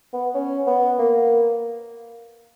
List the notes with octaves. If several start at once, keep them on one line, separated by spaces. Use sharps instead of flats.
B3
C#4
B3
A#3